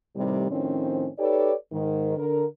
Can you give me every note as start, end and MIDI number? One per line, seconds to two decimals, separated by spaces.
0.16 0.48 45
0.16 0.48 48
0.16 0.48 51
0.16 0.48 55
0.50 1.08 45
0.50 1.08 51
0.50 1.08 53
0.50 1.08 60
0.50 1.08 61
1.18 1.53 63
1.18 1.53 67
1.18 1.53 69
1.18 1.53 71
1.18 1.53 73
1.18 1.53 74
1.72 2.15 44
1.72 2.15 51
2.17 2.46 50
2.17 2.46 70